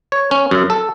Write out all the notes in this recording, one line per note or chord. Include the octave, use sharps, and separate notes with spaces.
C#5
C#4
F#2
A4